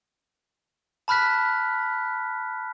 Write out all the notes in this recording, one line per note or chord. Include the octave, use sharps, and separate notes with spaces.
A5 B5 F6 F#6 B6